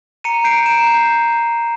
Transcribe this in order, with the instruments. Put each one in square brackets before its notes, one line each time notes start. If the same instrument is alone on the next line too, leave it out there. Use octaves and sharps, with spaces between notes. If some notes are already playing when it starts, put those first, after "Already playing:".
[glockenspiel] A#5 C#7 D#7
G6 C7 D7
A#5 D7 E7
G6